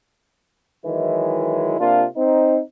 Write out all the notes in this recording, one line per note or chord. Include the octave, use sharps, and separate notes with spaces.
D#3 E3 F#3 G#3 E4
C3 A#3 D4 F4
C4 D#4